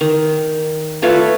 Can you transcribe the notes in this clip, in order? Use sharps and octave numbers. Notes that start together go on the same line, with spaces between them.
D#3
A3 F4 B4 C#5